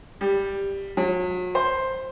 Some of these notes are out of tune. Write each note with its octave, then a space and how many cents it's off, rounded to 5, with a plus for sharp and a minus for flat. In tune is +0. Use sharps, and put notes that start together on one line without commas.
G3 +5
F#3 -40
C5 +5